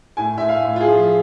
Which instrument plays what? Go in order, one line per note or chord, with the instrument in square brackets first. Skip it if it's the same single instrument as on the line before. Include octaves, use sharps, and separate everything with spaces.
[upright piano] A2 G#5
A2 E5
F5
A2
F4
G#4
F3